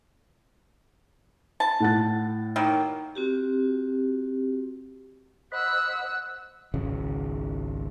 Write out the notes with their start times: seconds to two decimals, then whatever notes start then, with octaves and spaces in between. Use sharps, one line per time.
1.60 A5
1.80 A2 F#5 A6
2.56 D#3 F#3 A#3
3.15 C4 F#4 G4
5.52 C5 D#5 F#5 B5 E6 F#6
6.74 G#1 C#2 C#3